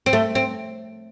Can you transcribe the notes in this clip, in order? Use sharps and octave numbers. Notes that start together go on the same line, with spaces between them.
C4
A3
C4